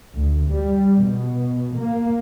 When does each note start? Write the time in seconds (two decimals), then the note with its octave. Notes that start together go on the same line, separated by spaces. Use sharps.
0.15 D2
0.48 G3
1.02 B2
1.76 A#3